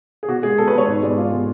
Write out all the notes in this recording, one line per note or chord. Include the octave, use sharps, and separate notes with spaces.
G#4
B2 F#4
G#3 B3 G#4
B2 A4
B4
G#3 B3 C#5
G#2
G#3 B3 D5
G#2 F4
G#3 B3